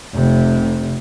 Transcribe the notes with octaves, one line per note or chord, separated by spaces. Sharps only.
F1 C3